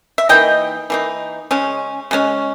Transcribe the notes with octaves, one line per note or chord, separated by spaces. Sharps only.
E5
E3 A#3 D#4 D#5 G5
E3 A#3 D#4
C#3 G#3 C#4
C#3 G#3 C#4